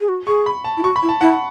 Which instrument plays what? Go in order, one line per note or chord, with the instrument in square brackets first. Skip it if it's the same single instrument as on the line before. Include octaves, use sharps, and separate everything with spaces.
[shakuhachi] G#4
F#4
[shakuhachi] G#4 [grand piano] C#6
[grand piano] B5
A5
[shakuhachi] E4
[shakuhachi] F#4 [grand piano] C#6
[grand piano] B5
[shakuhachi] E4
[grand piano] A5
[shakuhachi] E4 [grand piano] F#5